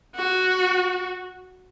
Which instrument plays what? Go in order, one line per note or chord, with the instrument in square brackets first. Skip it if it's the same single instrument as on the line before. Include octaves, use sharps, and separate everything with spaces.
[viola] F#4